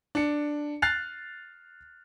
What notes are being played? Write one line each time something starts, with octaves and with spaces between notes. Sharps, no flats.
D4 C#7
F6 F#6 A6 C7 F7